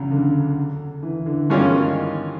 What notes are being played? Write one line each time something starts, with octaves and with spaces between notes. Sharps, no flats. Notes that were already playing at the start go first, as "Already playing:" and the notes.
Already playing: E2 C#3 F#3
D3
E3
D3
G2 D#3 E3 G#3 C#4 F4